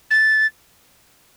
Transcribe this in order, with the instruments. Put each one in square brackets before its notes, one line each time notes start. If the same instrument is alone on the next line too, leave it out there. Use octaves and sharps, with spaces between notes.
[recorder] A6